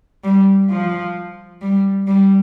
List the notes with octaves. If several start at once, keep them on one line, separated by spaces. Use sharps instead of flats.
G3
F3
G3
G3